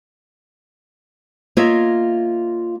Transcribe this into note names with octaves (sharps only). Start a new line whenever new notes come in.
A#3 F4 C#5 D#5 E5